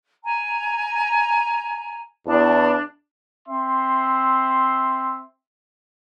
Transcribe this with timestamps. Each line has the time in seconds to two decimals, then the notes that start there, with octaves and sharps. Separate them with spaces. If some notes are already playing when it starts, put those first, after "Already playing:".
0.23 G#5 A#5
2.27 E2 D4 A5
3.47 C4 E5 C6